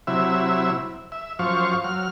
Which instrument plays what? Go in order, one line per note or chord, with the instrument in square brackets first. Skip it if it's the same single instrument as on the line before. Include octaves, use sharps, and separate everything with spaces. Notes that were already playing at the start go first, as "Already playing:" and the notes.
[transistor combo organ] C3 F#3 E4 E5
E5
F#2 F3 C5 F5 C#6
F#3 F6